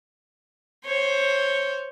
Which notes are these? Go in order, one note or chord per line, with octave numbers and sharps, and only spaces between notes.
C5 C#5